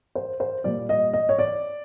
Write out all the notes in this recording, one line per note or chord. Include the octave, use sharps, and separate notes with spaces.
C5
C5
A#2 G3 D5
D#5
D#5
C#5
D5